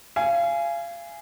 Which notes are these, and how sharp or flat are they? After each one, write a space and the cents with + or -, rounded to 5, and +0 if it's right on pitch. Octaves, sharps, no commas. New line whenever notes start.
F5 -30 G#5 +0